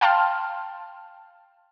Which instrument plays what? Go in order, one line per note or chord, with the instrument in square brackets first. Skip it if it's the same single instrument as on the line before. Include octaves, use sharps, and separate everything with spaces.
[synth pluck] F5 G5 A5 C6 F6